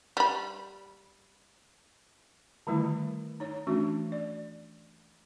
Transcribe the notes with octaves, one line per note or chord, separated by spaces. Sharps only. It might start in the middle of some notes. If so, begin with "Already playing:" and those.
G3 B5
D3 D#3 G3 A3 E4
D#4 C#5
E3 A3 C#4 D4 F#4
D5